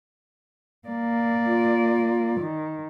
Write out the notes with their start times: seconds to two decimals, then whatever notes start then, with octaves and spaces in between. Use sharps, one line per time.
0.88 A#3 D5
1.46 F4
2.41 D#3